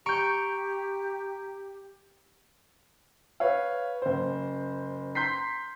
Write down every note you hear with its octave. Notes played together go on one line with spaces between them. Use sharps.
G4 A#5 C#6 G6 D7
B4 C#5 F5
F#1 C5
A#5 C6 G6 B6 C7